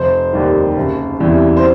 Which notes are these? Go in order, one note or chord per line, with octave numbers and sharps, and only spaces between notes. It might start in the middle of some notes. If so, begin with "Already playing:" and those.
Already playing: F1 C5
D#2 D#3 G3
F#1
E2 C3 E3 G3
C5